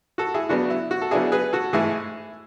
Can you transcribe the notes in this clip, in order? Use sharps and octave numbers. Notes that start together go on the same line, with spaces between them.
F#4 A4
E4 G#4
C#3 F#3 B3 D4 F#4
E4
F#4
A4
C#3 F#3 B3 D4 E4 G#4
G#4 B4
F#4 A4
G#2 E3 A3 E4 G#4